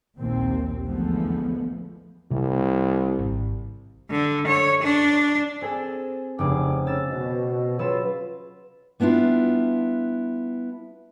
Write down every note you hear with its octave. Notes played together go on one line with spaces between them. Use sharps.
A#1 D#2 A#2 C4
E2 D3 F3 G#3 A3 B3
C2 C3 G3
G#1
D3
C#5
D4
C4 G#4 A4
F1 G2 C#3 G#4 D6
C#3 C#4 E6 A6
B2
C#3 F#3 F4 B4 E6
G3 B3 D4 E4 F4